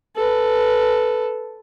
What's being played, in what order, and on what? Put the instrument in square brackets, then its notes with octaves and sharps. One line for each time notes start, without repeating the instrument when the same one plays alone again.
[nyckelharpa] A4 B4